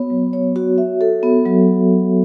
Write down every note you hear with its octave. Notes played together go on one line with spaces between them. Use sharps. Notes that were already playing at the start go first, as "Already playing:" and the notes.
Already playing: B3 F#4 C#5
F#3
C#5
F#4
E5
A4
B3
F#3